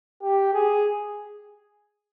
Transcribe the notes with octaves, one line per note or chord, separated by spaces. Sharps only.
G4
G#4